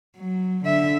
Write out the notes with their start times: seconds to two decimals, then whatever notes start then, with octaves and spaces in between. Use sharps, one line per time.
0.17 F#3
0.65 D3 E5